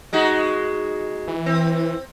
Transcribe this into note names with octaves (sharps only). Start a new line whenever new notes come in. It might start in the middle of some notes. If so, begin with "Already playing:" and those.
G#3 D#4 F#4
E3
C4